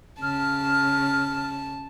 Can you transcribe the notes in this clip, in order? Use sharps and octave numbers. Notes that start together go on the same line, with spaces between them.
C#3 A5 F6